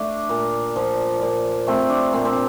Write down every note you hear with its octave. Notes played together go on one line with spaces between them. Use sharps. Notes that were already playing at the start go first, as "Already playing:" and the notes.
Already playing: A3 D4
A#2
F3
A#2
A3 C4
D4
A#2 C4
C4